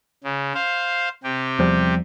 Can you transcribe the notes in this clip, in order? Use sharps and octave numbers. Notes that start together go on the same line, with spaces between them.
C#3
C5 F5
C3 G4
E2 F3 G3